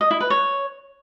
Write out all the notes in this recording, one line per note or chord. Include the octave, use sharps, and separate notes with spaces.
D#5
E4
B4
C#5